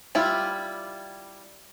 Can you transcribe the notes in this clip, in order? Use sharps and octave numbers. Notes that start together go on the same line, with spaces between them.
G3 E4 F4